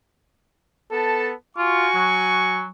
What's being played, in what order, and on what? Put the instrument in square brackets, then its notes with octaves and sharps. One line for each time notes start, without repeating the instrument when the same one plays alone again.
[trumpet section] B3 A5 [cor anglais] A4
[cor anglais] F4 [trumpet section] F#4 G#5 C#6
[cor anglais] F#3